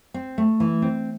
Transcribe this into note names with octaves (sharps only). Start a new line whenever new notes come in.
C4
A3
E3
C4